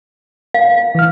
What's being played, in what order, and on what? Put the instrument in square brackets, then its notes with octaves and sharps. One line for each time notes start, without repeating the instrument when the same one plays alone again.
[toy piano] F5
[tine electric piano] E3 F6